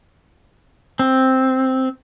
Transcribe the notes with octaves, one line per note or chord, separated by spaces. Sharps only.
C4